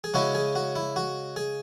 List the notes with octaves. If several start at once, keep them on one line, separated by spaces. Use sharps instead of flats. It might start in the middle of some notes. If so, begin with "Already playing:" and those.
G#4
C#3 G#3 C#4 E4 F#4
G#4
F#4
E4
F#4
G#4